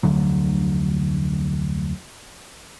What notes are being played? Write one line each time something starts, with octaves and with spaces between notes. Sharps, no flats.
F1 D2 D3 F#3